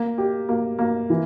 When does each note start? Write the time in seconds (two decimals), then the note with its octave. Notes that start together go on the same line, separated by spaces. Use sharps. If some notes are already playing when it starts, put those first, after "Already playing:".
Already playing: A#3
0.18 G4
0.49 A#3
0.79 A#3
1.10 E3